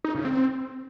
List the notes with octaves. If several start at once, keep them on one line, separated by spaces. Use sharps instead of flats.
D#4
C#3
C4